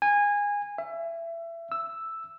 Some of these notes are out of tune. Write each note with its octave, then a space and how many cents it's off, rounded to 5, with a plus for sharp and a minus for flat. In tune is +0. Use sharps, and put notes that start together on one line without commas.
G#5 -20
E5 +25
E6 +0